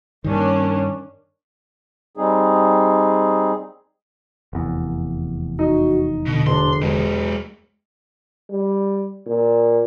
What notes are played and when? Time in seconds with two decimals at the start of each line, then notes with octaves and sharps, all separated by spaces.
0.24 G2 D#3 A#3 C#4 D4
2.17 G3 C4 D#4 G#4
4.53 F1 E2
5.59 D#4 F#4
6.26 B2 D3
6.47 E1 D4 C6
6.82 E1 G#3 G4
8.50 G3
9.27 A#2